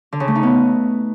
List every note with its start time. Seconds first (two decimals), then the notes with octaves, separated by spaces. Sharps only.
0.12 D3
0.20 C#3
0.28 A3
0.35 D#4
0.43 B3